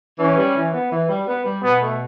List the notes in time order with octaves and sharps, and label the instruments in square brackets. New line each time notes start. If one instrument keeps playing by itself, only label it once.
[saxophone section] E3 [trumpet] C#4
[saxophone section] G3
E3
B3
E3
G3
B3
G3
[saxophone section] B2 [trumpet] B3
[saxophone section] A3